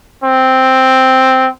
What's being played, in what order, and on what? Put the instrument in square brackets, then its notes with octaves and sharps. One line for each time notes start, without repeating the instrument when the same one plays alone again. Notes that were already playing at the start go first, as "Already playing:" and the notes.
[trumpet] C4